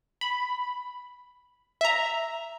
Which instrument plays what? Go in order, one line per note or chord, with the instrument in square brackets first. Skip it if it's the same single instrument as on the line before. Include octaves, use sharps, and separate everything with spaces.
[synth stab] B5
E5 A#5